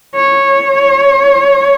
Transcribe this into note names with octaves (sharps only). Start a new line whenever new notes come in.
C#5